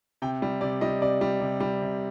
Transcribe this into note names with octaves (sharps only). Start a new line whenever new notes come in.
C3 G5
G3
C3 D5
G3 D#5
C3 D5
G3
C3
G3
C3